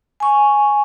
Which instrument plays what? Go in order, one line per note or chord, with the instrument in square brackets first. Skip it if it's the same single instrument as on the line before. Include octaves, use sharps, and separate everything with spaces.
[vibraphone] G#5 C#6